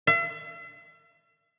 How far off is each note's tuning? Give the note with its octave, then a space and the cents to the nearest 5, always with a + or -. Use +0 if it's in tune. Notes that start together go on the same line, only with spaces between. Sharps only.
E5 +45